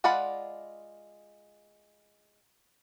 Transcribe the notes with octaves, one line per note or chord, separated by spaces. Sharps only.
G#3 F4 D5 F#5 B5